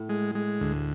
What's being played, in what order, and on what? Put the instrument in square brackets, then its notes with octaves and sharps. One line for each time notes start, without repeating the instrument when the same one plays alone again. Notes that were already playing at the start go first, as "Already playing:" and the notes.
Already playing: [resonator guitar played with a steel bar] A2
[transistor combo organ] G#3
G#3
D2